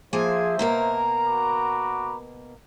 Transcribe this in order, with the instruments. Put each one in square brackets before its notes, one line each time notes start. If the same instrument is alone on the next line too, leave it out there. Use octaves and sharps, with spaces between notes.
[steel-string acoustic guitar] F3 A#3 G#5 [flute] G#4 [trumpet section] C5 E5
[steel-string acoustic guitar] B2 A#3 A#4 [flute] A#5
[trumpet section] F#4 B5 D6